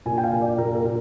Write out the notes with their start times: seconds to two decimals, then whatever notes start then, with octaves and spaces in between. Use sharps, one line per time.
0.06 A#2 G#5
0.18 G5
0.24 F5
0.32 A#2
0.41 D5
0.58 A#2 A#4
0.75 A#4
0.85 A#2